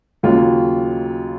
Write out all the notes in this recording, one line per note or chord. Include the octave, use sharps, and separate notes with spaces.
D#2 C#3 F#3 F4